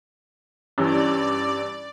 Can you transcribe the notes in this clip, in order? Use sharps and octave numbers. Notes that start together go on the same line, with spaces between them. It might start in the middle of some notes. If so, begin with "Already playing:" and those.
G2 E3 C#4 D5